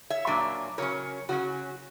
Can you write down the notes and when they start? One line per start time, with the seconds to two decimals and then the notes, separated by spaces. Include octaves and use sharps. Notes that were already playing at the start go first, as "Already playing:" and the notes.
0.10 C#5 E5
0.27 A#2 F#3 A#3 D4
0.78 C#3 F#3 C#4 A#4 C#5
1.29 C#3 F#3 C#4 F#4